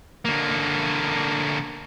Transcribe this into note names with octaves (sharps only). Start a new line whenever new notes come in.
D3 A#3